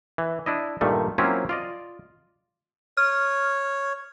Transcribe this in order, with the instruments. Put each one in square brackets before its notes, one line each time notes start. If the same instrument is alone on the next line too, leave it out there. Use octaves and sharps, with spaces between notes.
[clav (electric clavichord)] E3
D4 E4 D#5
G2 A#2 D#3 G3 A3
F#3 A#3 C4 C#4 E4 F4
F4 D5 D#5
[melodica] C#5 [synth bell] F6